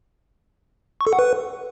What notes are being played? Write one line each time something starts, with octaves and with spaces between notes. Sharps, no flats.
C#6
A4
F#5
B4